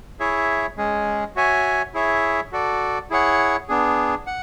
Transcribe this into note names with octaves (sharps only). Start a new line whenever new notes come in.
E4 G#4 C#5 E5
G#3 C#4 G#4
F#4 C#5 E5 G#5
E4 G#4 C#5 E5
F#4 A4 D5
E4 G#4 C#5 F#5
B3 D4 G#4
F#5